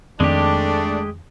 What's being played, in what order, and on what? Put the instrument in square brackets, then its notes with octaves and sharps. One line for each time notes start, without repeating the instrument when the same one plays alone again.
[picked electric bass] F2 D#3 C4 [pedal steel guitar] G#3 G4 [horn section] A3 D4